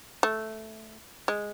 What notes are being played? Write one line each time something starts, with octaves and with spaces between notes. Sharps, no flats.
A3
G#3